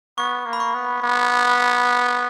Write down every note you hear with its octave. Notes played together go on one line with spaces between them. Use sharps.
B3 C#6
A#3
B5
C#6
B3
B3